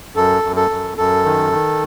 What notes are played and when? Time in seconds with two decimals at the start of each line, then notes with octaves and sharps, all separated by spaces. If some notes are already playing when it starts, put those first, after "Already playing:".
0.15 F#2 A4
0.43 F#2
0.56 A4
0.70 F#2
0.97 F#2 A4
1.25 D#3
1.52 D#3